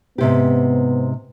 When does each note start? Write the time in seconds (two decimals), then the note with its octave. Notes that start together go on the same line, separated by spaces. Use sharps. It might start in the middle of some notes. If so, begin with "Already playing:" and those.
0.18 G#2 C3 B3 G4